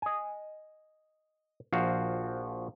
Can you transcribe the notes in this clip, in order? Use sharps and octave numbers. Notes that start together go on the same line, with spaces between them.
D#5 G#5
A#1 F3 F#4 F5